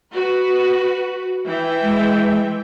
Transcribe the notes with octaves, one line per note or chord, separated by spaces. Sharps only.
F#4 B4
E3 E5 G5
G#3